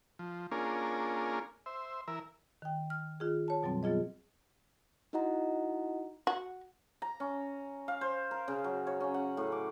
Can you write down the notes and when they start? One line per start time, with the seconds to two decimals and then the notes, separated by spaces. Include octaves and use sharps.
0.19 F3
0.52 A#3 C#4 D4 F4 G#4 A#4
1.66 C5 E5
2.08 E3 A#4 E5
2.62 D#3 G5
2.90 F6
3.20 D#3 F4 G#4
3.48 C#5 A5
3.62 F#2 B2 F#3 G3 C4
3.83 F#3 B3 F4 G#4 D#5
5.13 D#4 E4 F#4 D#5 F#5 A#5
6.27 F#4
7.02 A#5
7.20 C#4
7.88 F5
8.01 C5
8.31 A#4
8.48 C#3
8.64 F#3
8.87 C#5
9.00 C#4
9.14 F#5
9.37 A2
9.52 D6